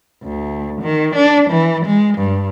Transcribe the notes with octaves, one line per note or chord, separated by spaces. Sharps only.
D2
D#3
D4
E3
G#3
G2